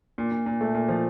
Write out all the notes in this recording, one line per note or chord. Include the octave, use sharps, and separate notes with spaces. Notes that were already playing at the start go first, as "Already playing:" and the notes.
A#2
A#2
A#2
A3
A#2
F3